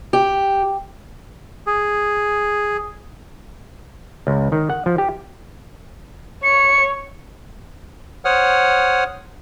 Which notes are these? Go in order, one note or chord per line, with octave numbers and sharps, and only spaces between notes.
G4
G#4
C#2
D#3
F#5
F3
G4
C#5 C#7
C5 C#5 F#5 D#6 F6